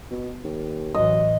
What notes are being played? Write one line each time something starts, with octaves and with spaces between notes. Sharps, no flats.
B2
D#2
A1 E3 F#3 D#5